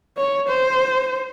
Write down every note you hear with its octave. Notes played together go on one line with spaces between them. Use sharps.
C#5
C5